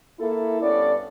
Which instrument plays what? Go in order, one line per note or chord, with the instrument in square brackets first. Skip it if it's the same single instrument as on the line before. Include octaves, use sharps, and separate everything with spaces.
[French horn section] A#3 E4 A4
G2 B3 C#4 A4 D5